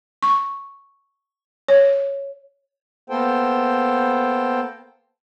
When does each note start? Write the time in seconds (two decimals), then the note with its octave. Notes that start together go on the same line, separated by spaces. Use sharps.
0.23 C#6
1.68 C#5
3.10 A#3 B3 A4 C5 G5